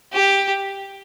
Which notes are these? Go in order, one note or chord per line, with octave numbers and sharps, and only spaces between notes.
G4